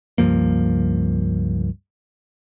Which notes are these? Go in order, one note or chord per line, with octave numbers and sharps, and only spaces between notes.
C#2 G2 F3 A#3